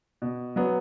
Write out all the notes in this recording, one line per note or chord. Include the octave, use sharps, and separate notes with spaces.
B2
F#3 B3